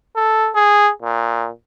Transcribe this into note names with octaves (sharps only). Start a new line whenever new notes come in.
A4
G#4
A#2